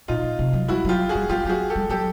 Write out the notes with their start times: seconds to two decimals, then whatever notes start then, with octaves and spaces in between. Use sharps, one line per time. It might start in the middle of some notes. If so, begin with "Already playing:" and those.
0.08 A#2 D#4 F4
0.23 A#2
0.39 C3
0.53 F#3
0.68 G3 E4 F#4
0.85 F#3 F4 G4
1.09 F#4 G#4
1.15 G3
1.29 G3 F4 G4
1.45 F#3 G4
1.49 F#4 G#4
1.70 G4 A4
1.76 G3
1.89 F#3 G4 A4